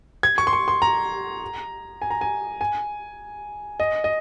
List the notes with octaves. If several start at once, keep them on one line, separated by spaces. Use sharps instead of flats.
G#6
C#6
C6
C#6
C6
A#5
G#5
A#5
G#5
G#5
D#5
D#5